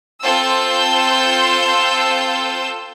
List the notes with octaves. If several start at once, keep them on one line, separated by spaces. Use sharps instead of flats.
C4 F4 A4 C5 E6 G6